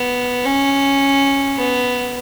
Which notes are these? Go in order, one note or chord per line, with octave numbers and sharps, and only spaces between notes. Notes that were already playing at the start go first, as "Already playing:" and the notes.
Already playing: B3
C#4
B3